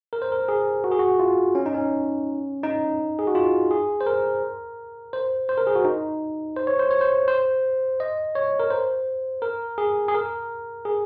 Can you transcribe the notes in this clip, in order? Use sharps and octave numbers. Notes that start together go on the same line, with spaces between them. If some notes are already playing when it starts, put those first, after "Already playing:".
A#4
C5
A#4
G#4
F#4
G#4
F#4
F4
C#4
D#4
C#4
D#4
G#4
F#4
F4
G#4
C5
A#4
C5
C5
A#4
G#4
F#4
D#4
C5
C#5
C5
C#5
C5
C5
D#5
C#5
A#4
C5
A#4
G#4
G#4
A#4
G#4